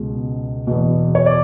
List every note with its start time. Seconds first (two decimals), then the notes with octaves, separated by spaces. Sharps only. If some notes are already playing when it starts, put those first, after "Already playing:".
Already playing: C#2 B2
0.67 E2 B2
1.15 C#5
1.26 D5